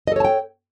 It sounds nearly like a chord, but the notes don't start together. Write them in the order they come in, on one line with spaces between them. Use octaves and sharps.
D#5 A4 C#5 A5 G5